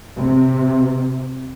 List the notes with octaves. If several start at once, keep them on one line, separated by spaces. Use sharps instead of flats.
C3